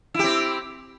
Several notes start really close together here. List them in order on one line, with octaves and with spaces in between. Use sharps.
E4 G4 C4